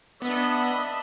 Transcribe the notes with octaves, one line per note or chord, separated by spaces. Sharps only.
B3 D4 D#5 E5 B5